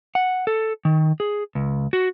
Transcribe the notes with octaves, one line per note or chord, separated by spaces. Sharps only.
F#5
A4
D#3
G#4
C#2
F#4